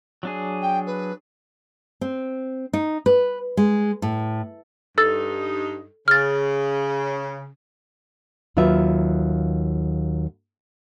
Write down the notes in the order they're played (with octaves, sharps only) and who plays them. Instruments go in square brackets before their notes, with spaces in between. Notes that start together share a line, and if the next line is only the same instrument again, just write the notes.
[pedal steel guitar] F#3 D4 G#4
[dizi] G5
B4
[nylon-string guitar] C4
D#4
B4
G#3
A2
[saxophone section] G2 D#4 [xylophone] A4 E6 A6
[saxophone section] C#3 [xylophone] F6 A6
[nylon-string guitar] D#2 F#3 F4 B4 E5